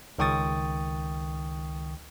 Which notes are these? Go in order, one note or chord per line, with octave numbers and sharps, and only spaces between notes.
C#2 D#3 G5 C#6 D#6 A6